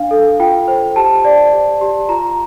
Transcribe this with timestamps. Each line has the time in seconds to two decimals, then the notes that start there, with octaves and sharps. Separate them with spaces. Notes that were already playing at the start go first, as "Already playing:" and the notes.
Already playing: D4 F5
0.11 A4
0.40 F4 G5
0.68 C5
0.96 G4 A5
1.25 D5
1.53 G4
1.81 G4
2.09 F4 A#5